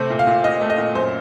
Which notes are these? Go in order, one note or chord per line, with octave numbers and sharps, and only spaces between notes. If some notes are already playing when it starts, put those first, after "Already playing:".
Already playing: C3 A3 C5
A#2
F5
A#2
A#2 D#5
A3
D#5
A#2
F#2 C5